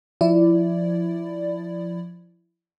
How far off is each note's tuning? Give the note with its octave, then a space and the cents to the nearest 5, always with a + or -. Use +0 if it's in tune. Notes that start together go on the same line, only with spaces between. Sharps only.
F3 +5 E4 +15 D5 +0